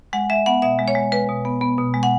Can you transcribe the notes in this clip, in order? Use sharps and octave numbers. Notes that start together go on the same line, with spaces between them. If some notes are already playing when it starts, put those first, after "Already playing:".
G#3 F#5
G#3 E5
B3 F#5
B2 E5
G#3
C#5
G#3
G#3 B4
B2
B3
B3
B2
G#3
F#5